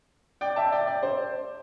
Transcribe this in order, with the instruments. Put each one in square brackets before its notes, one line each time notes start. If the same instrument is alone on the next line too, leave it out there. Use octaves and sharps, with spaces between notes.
[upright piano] D5 G5
E5 A5
D5 G5
D5
C5